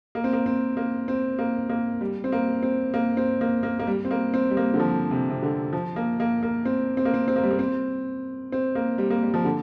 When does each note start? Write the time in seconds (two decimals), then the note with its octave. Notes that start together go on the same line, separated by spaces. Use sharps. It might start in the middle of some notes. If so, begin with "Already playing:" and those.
0.15 A#3
0.24 C4
0.33 A#3
0.46 C4
0.77 A#3
1.08 C4
1.39 A#3
1.69 A#3
2.01 G3
2.24 C4
2.32 A#3
2.63 C4
2.94 A#3
3.17 C4
3.41 A#3
3.63 A#3
3.79 A#3
3.87 G3
4.05 C4
4.11 A#3
4.34 C4
4.50 G3
4.57 A#3
4.74 D3
4.80 F3
5.11 C3
5.30 C3
5.42 D3
5.73 F3
5.96 A#3
6.20 A#3
6.43 A#3
6.65 C4
6.97 C4
7.05 A#3
7.14 C4
7.28 C4
7.36 A#3
7.43 G3
7.51 A#3
7.59 C4
8.52 C4
8.75 A#3
8.98 G3
9.10 A#3
9.22 G3
9.34 F3
9.45 D3